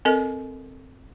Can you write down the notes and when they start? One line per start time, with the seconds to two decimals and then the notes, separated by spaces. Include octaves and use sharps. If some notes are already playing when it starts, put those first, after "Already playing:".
0.05 C4 A4 A#4 D#5